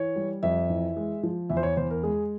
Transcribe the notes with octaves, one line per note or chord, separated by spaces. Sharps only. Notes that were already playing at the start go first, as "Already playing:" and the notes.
Already playing: E3 C#5
G3
F2 E5
E3
G#3
F3
E2 E5
C5
C#5
E2 C5
A#4
G#3 G#4